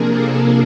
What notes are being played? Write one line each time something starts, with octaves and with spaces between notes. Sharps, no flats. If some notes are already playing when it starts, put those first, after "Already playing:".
Already playing: C3 F3 A#3 D4 G#4 A#4
A4